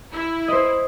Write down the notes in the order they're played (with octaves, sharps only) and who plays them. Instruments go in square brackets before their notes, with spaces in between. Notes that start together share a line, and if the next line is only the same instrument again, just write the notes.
[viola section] E4
[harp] C5 D#5